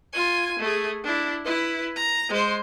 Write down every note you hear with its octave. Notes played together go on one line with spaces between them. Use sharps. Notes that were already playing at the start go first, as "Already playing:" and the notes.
F4 G#5
A3 G#4
D4 E4
E4 B4
A#5
G#3 C5